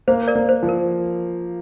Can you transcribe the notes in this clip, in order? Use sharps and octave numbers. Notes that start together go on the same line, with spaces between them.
A#3 C5
A#4 D5
A#3
C5
F3
A#4